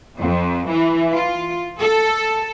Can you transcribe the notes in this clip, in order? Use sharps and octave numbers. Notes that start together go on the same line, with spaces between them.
F2
E3
F4
A4